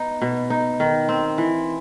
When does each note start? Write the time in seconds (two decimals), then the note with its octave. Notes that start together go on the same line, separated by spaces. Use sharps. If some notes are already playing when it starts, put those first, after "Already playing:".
Already playing: B3 D#4
0.22 B2
0.50 D#4
0.80 D#3
1.09 C4
1.38 E3